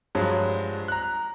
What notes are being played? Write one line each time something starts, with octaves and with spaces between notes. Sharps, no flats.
G2 F3 F#3 G#3
A#5 F#6